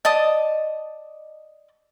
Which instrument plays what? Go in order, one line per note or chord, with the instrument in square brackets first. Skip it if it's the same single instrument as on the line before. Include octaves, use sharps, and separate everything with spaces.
[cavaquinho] D5 D#5 A5 D#6